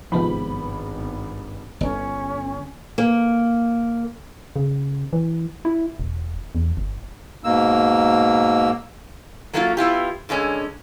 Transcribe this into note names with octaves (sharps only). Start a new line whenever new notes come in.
G#1 G2 C3 D#3 F3 G#3 B3 B5
G1 C#4
A#3
C#3
E3
E4
E1
E2
G1
G#2 B2 A#3 E6
F#3 A3 A#3 C#4 D#4 F4
B3 E4 F4 G4
G2 D3 G#3 C#4